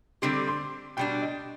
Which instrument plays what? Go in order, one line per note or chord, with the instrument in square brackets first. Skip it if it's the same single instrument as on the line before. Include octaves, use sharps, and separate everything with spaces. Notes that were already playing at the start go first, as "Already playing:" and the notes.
[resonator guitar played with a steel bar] D3 G3 C4 G4 [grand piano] C6
[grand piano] C6
[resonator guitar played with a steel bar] B2 G3 D4 [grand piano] G5
[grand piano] D#5